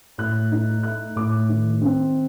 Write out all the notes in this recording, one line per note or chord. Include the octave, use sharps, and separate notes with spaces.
A2 F#6
D#4
A3 F#6
A2 D6
D#3
C4